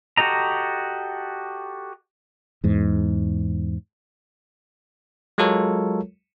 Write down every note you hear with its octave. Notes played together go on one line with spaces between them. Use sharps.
F#4 G4 A4 D#5 A#5
E2 G#2
F#3 G#3 F4 A4 A#4 C#5